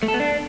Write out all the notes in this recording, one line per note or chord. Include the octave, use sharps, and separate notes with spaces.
A3
A4
B3
D4